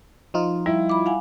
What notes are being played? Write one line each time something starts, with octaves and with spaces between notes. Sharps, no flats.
F3 D#4 F4
G3 E4
B5 D6
F5 F#5 G#5